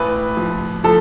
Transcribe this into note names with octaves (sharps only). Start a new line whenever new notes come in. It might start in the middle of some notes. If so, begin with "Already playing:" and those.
Already playing: A1 B4
F3
F3 A4